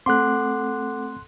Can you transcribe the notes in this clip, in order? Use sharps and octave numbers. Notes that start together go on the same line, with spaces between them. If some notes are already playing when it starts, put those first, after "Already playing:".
A3 C4 A4 F#5 C6 D6 F#6